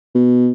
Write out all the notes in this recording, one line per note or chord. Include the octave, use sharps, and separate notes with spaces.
B2